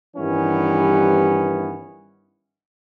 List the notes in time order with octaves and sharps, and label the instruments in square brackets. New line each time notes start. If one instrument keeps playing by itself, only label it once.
[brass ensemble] G2 D#3 E3 G3 B3 C#4